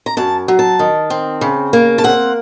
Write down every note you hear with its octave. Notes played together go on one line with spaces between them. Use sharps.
A#5
F#2 A5
F#3
A5
D#3
C4
C#3
A#3
A5
C4 F#5